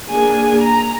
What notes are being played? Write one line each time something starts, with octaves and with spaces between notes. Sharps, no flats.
A#3 D4 G#4 G#5
A#5